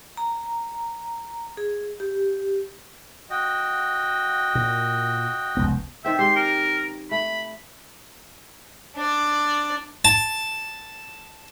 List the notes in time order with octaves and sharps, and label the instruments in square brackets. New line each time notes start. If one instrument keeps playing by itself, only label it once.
[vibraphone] A#5
G#4
G4
[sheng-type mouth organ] F#4 D#5 G5
[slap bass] A#2
F1 C#2 B3
[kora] D#3 C4 G5 [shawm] E5
[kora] G#3 G4 [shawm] C6
[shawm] A#4
[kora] A3 [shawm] B5
[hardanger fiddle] D4 D5
[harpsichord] A5